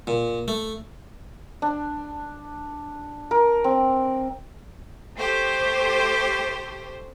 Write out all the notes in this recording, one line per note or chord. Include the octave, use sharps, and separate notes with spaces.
A#2
A3
D4
A#4
C4
A3 G4 C5